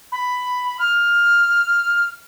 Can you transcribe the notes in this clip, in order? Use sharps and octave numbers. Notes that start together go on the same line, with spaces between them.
B5
F6